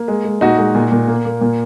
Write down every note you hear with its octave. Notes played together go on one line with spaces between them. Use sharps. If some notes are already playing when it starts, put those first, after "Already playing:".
Already playing: A#3
G#3
G#3
A#2 D#4 F#4
G#3
A#2
A#2
A#3
A#3
A#2